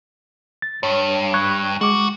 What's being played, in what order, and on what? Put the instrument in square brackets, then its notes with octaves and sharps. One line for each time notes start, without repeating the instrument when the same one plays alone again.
[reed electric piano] A6
[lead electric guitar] G2 [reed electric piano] C#5
[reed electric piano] C#6 F#6 G#6
[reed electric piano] G#3 D6 [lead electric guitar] F#4